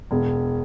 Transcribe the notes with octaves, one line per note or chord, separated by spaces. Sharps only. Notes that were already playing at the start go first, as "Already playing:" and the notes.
E1